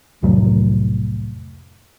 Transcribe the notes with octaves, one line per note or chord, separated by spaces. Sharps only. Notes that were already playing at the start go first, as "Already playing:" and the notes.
C2 F2 A2 F#3